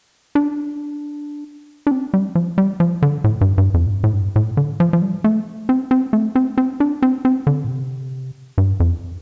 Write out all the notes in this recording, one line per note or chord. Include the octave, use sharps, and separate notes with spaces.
D4
D4
C4
G3
F3
G3
F3
D3
A2
G2
G2
F2
A2
G2
A2
G2
A2
D3
F3
F3
G3
A3
C4
C4
A3
C4
C4
D4
C4
C4
D3
A2
C3
G2
F2